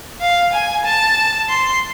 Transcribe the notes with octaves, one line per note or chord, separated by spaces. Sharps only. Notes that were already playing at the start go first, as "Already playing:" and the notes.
F5
G#5
A5
C6